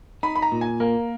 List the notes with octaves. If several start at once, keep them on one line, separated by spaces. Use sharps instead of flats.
D#4 B5
B5
A#5
A#2
G#5
A#3 A#4